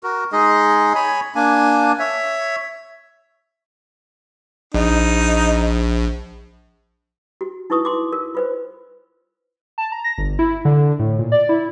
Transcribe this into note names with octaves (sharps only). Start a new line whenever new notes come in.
F#4 A#4
G#3 D#4 G#4 D#5
C#5 G#5 B5
A#3 D4 G#5
C#5 E5
A#1 D#4
F#4
D#4 E4 B4 C#6 D#6
C6 D6
A#4
F4 B4 C5
A5
A#5
A#6
G1
E4
D3
A2
A#2
D5
E4